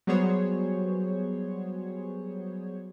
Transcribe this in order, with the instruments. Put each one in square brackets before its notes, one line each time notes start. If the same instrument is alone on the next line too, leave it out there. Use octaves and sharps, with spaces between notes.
[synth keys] F#3 G3 B3 G#4 C5 C#5